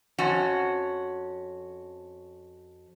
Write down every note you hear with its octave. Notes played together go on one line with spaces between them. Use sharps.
F2 C#4 F#4